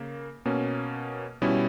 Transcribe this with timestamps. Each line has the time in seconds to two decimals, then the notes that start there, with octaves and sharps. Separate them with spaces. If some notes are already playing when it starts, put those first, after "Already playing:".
Already playing: C#3 A#3
0.45 B2 A#3 C#4
1.42 B2 G3 C#4 E4